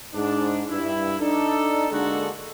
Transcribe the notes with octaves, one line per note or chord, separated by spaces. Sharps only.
G#2 D4
G2 E4
D4 D#4 A4
D3 G#3 A#3 D4 F#4 A4